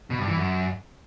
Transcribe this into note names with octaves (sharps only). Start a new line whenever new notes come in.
B2
G2
E3
F#2